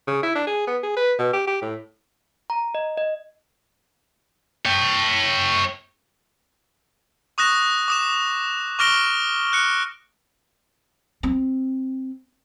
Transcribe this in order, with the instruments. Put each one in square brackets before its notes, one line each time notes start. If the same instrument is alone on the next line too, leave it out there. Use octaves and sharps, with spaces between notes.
[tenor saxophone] C#3
E4
D4
G#4
B3
G#4
B4
B2
G4
G4
A2
[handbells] A#5
D#5
D#5
[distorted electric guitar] C#5 G5
[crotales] C#6 D#6 F#6 A#6 E7
D6 D#6 E7
C#6 D6 F6 A#6 D7 G7
F#6 C#7
[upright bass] C4